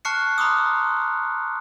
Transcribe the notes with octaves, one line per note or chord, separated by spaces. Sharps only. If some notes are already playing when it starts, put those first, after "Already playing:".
A5 C#6 F6 F#6 C7 C#7
A#5 C6 D6 D#6